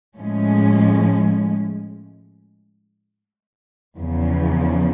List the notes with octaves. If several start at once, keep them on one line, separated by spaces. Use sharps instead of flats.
A2 F3 G#3 C#4
E2 C#3 F3